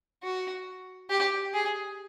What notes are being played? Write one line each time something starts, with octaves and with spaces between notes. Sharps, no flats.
F#4
G4
G#4